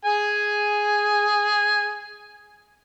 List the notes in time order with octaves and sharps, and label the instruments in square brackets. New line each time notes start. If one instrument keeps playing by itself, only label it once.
[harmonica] G#4 G#5